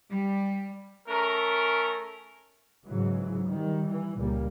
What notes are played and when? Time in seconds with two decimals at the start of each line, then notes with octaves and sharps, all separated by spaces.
0.11 G3
1.08 A3 C#4 A#4
2.86 G#2 C#3 E3 F#3
3.47 D#3 G3
3.86 E3
4.17 C#2 A#2 G3 A#3